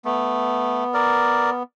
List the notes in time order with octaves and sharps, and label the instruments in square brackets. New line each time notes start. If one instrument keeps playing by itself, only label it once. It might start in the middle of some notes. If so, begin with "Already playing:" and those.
[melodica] A3 [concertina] B3
[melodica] A#4 D5